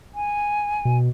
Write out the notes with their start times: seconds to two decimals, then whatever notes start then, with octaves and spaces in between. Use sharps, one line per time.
0.15 G#5
0.85 B2